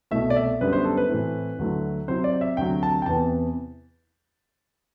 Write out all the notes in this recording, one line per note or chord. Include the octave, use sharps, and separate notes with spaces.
C2 B2 A3 E4 E5
D5
E5
F#2 D3 G3 B3 B4
C5
A4
B4
A2 E3 A3 C4 E4
D2 D3 F#3 A3 E4
C3 F#3 C4 E4 C5
D5
E5
D2 C3 F#3 G5
A5
G5
E2 C3 E3 B3 A5